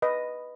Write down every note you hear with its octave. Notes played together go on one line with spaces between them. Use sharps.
B4 D#5